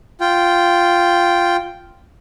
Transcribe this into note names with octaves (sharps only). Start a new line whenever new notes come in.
F4 G5